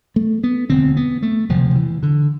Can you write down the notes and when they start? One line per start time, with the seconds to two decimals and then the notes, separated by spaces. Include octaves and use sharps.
0.16 A3
0.44 B3
0.69 E1 D2 D3 C4
0.97 B3
1.22 A3
1.49 E1 D2 C3 F3
1.75 E3
2.03 D3